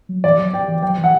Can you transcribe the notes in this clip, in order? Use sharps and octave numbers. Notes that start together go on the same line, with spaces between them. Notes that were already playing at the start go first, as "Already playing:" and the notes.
F#3
E3 D5
F#3
G5
E3
F#3 G5
E3
F#5